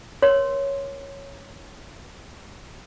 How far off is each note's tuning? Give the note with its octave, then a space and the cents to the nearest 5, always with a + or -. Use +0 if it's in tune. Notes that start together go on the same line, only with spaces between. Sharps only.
A#4 +30 C#5 +0 C6 +0